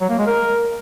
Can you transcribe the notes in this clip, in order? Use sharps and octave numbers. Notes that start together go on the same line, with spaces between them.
F#3
A#3
G#3
A#4